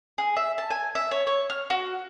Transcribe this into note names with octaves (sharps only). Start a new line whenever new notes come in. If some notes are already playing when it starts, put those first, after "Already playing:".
G#4
E5
A5
G#5
E5
C#5
C#5
F6
F#4